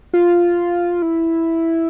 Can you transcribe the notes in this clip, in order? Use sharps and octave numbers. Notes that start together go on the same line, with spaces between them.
F4
E4